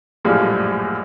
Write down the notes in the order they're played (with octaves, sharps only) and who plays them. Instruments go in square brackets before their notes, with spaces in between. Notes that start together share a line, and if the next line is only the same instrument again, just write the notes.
[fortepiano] A#1 F#2 A2 F3 G3 G#3